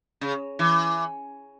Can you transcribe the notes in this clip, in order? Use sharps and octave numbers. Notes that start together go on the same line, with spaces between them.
C#3
E3